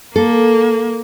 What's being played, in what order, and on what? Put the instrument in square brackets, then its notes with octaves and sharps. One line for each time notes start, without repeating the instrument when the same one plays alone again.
[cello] A#3 [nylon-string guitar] A4